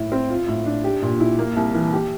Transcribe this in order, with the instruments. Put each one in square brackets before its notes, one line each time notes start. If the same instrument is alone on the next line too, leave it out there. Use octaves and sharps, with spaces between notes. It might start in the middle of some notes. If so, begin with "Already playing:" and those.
Already playing: [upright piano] A2 E4
C4
F4
A2
D4
G4
A#2
E4
A#3
C2
E3
G4